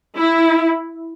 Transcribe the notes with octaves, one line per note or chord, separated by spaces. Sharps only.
E4